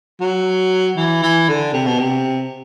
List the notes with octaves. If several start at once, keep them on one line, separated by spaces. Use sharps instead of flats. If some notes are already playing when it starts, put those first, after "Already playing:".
F#3
E3
E3
D3
C3
B2
C3